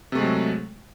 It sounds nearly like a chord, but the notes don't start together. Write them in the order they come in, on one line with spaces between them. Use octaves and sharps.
C3 A3 G#3 F#3